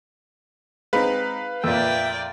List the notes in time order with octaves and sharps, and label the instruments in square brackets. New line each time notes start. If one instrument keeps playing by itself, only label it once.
[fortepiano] G#3 C4 D#4 [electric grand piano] B4 F5 B5
[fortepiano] F2 A#2 [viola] D5 G5 [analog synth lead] E5